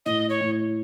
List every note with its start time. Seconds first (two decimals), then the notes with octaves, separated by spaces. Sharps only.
0.06 A2 D#5
0.30 C#5
0.41 A2